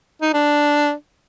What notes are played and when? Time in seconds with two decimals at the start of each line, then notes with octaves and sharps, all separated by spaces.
0.22 D#4
0.34 D4